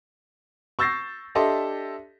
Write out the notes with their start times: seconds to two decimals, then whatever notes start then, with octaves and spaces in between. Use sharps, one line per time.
0.79 C#6 E6 G6 A6 A#6 C7
1.35 D4 G4 A4 D#5 E5 C6